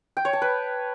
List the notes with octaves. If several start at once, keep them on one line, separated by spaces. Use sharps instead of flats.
G5
C#5
A5
B4